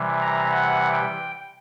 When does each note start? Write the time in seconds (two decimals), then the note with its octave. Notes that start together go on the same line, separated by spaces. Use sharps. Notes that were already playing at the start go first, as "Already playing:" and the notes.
Already playing: C3 E3 G3
0.22 A#5
0.51 F#5
0.93 G5